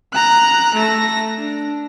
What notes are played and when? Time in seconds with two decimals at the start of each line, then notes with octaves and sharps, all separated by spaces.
0.13 A#5 F#6
0.75 A3 A#6
1.37 D4